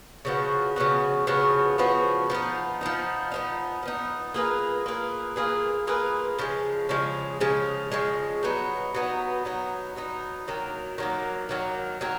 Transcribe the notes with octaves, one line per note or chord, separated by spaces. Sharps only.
C#3 F3 B3 F#4
C#3 F3 B3 F#4
C#3 F3 B3 F#4
C#3 F3 B3 F#4
F3 B3 D#4
F3 B3 D#4
F3 B3 D#4
F3 B3 D#4
A#3 F4 G#4 B4
A#3 F4 G#4 B4
A#3 F4 G#4 B4
A#3 F4 G#4 B4
C#3 F3 G#3
C#3 F3 G#3
C#3 F3 G#3
C#3 F3 G#3
F#3 B3 D#4
F#3 B3 D#4
F#3 B3 D#4
F#3 B3 D#4
D#3 F#3 A#3
D#3 F#3 A#3
D#3 F#3 A#3
D#3 F#3 A#3